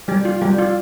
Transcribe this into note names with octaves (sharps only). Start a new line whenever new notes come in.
G3 G4
F4
G3 G4
F4